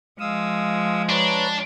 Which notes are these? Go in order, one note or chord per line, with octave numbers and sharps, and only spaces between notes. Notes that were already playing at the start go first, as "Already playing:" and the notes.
F3 G#3 F5 D#6 E6
D4 B4 C#5 A#5